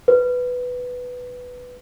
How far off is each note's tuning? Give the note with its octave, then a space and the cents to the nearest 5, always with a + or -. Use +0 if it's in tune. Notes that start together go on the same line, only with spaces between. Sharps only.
B4 +5